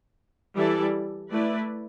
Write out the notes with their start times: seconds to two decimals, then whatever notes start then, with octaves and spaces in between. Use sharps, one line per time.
0.55 E3 G3 E4 A4 D5
1.30 A3 E4 B4 D5